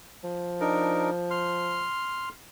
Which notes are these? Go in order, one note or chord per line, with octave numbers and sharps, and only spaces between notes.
F3
D4 D#4 A#4
C6 F6